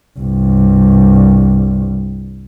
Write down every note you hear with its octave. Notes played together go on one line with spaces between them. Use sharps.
C2 G2